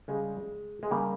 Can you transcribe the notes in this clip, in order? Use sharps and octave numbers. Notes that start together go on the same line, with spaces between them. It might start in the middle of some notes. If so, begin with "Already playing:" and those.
C#3 G3 G#3
G#3
C#3 G3 A#3